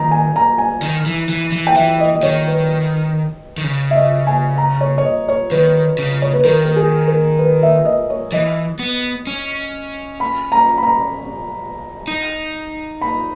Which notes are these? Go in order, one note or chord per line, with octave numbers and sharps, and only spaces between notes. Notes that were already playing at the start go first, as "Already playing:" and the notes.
Already playing: D#3 A#5
G#5
A#5
G#5
D#3
E3
E3
E3
G5
E3 E5
D#5
D#5
D#3 C#5
B4
D#3
C#3
E5
D#5
G#5
A#5
C#5
C#5
D#5
C#5
D#3 B4
C#3
C#5
B4
D#3 A#4
A#4
G#4
A#4
B4
E5
D#5
C#5
E3 D#5
B3
C#4
B5
A#5
B5
A#5
D#4
B5